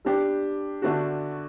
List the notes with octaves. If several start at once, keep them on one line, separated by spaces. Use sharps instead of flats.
G3 D4 G4
D3 A3 D4 F#4